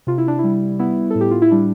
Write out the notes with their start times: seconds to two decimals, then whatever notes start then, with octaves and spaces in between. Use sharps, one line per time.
0.07 C3 F4
0.18 E4
0.28 D4
0.39 G3 E4
0.79 B3 E4
1.10 A4
1.15 A2
1.21 G4
1.31 F4
1.42 E4
1.51 G3 D4